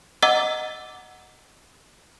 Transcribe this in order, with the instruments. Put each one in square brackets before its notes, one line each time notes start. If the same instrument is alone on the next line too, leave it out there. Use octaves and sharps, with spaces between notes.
[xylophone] D#5 F#5 A#5 D6 E6 A6